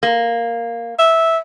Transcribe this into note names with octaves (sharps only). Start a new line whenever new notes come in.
A#3
E5